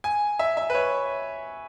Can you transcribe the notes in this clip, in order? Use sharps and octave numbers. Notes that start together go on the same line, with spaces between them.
G#5
E5
E5
B4
C#5